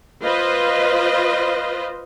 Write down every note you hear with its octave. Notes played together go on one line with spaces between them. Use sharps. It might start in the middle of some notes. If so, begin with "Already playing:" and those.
F4 B4 C5 D#5